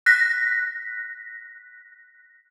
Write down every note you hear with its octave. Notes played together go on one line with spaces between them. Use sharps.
F#6 A#6 B6